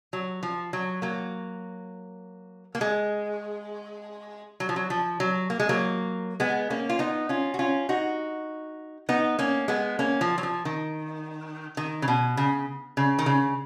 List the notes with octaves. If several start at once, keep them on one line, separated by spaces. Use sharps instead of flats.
F#3
F3
F#3
F#3 A#3
A#3
G#3
F#3
F3
F#3
F3
F#3
A#3
G#3
F#3 A#3
G#3 B3
A#3 C#4
F4
B3 D#4
C#4 F4
F#4
C#4 F4
D#4 F#4
B3 D#4
A#3 C#4
G#3 B3
A#3 C#4
F3
F#3
F3
D#3
D#3
C#3
B2
C#3
C#3
D#3
C#3